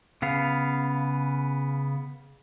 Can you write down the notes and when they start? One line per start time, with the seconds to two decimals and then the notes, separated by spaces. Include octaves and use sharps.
0.22 C#3 B3 F5